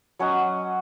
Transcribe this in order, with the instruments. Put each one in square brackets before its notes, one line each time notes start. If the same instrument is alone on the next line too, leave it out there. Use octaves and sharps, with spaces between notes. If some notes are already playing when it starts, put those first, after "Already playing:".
[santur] F#3 C#4 F#4 D#5